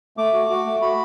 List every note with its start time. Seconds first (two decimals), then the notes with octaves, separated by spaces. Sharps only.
0.17 A3 D6
0.33 F#4
0.50 F#4
0.66 A3
0.82 F#4 B5